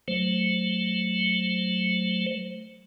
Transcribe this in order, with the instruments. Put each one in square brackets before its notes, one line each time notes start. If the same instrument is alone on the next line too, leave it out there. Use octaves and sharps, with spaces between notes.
[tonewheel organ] F#3 A3 C5